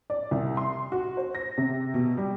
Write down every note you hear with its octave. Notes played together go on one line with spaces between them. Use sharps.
D5
C2
C6
F#4
C5
A#6
C3
B2
G3